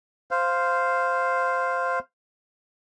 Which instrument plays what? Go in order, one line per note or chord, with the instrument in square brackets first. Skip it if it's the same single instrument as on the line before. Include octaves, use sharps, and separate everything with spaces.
[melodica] C5 F5